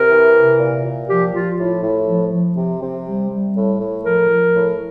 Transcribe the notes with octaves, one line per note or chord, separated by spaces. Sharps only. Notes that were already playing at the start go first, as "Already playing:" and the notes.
Already playing: C3 A#4
E3
C3
A#2
A#2
F3 G4
F3 F4
A2
A2
F3
F3
C3
C3
G3
G3
A2
A2
F3 A#4
F3
A2